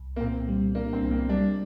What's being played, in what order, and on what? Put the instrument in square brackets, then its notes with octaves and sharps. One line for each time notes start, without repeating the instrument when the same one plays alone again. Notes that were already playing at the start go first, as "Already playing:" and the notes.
Already playing: [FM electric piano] C2
[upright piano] A#3
[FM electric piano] A#2 [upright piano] C4
[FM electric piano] G3
[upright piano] A#3 [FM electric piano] D4
[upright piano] C4
[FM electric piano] C2
[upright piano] A#3
[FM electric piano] G3 [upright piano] D4